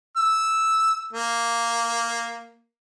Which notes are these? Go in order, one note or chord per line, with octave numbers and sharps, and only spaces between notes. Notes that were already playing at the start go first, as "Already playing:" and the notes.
E6
A#3